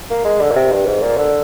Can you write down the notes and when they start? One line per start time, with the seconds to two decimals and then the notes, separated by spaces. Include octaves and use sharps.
0.10 A#3
0.25 G#3
0.41 D3
0.51 A#2
0.56 C3
0.72 G2
0.86 G#2
1.02 A#2
1.17 D3